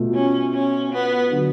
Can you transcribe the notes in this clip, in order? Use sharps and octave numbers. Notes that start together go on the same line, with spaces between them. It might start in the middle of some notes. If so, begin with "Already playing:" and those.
Already playing: B2 A3 F4
C#4
C#4
B3
D3 F#3